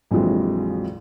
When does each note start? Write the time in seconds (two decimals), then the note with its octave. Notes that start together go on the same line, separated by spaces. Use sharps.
0.11 A#1 F2 E3 F#3 G#3